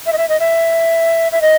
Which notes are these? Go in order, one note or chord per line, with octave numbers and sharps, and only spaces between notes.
E5
D#5
E5
D#5
E5
E5
D#5